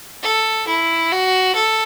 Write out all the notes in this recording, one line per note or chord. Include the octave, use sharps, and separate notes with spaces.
A4
E4
F#4
A4